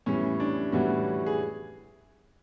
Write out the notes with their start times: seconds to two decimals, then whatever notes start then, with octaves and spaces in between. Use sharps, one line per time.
0.06 A2 E3 G3 C#4
0.40 D4
0.72 A2 E3 G3 F#4
1.26 G#4